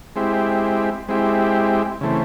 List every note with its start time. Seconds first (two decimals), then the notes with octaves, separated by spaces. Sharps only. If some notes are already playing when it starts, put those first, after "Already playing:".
0.16 G#3 C4 E4 G4
1.09 G#3 C4 E4 G4
2.01 C#3 E3 A3 C4